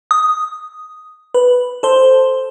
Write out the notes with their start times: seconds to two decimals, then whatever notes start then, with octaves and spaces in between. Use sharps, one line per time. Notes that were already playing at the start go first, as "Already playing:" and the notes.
0.11 D#6
1.34 B4
1.83 A4 C5